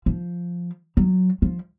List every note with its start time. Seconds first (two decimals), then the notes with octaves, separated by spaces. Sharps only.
0.06 F3
0.97 F#3
1.42 F3